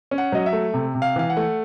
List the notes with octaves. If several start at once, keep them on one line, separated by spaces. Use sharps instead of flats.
C#4
F#5
F#3 D#5
E5
A3
C3
C3
F5
E3 F5
F#5
A3